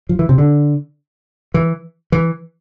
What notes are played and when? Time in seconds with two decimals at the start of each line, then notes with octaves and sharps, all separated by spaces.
0.09 F3
0.19 E3
0.29 C3
0.38 D3
1.54 E3
2.12 E3